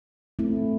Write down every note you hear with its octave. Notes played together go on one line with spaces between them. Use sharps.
A3 C4 E4